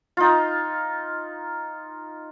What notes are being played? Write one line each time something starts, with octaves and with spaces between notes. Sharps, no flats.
D#4 F4